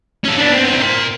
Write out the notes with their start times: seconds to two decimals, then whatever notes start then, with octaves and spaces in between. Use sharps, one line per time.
0.24 C#4 A4
0.38 B3 D4
0.54 B3 C4
0.69 C4 E4
0.82 A#4 C6